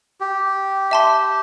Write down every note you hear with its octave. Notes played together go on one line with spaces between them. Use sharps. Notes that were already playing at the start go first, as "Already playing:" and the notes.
G4
E5 A5 C6